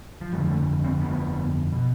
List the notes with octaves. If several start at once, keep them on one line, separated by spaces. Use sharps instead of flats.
F3
G1 F2 D3 G3
A3
C4
B3
B2